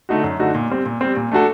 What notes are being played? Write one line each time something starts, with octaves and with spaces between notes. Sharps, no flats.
D3 A3 D#4 F#4
F#2
D3 A3 D#4 F#4
A#2
G3 C4
A#2
G3 C4
A#2
A3 D4 F#4 A4